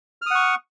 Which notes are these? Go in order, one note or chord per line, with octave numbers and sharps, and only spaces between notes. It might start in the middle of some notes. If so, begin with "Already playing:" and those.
F#5 C#6 D#6 F6